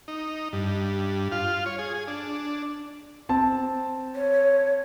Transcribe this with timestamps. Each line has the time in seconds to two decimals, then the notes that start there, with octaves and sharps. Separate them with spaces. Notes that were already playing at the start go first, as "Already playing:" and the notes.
0.08 D#4
0.53 G2
1.32 F4
1.66 C#5
1.78 G#4
1.94 G#4
2.08 D4
3.29 C4 A5
4.15 C#5